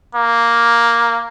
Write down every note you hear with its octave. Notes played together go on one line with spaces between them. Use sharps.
A#3